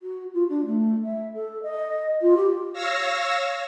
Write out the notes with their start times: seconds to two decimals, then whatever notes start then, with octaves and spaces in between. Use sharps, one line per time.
0.03 F#4
0.34 F4
0.49 D4
0.66 A3
1.04 E5
1.34 A4
1.63 D#5
2.21 F4
2.37 G4
2.73 C#5 F5 E6 A#6